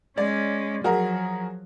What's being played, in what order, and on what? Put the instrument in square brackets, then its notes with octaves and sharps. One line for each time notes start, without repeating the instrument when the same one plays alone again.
[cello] G#3 C#4 [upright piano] D5
[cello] F3 F#3 [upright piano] F#4 G#4 A#4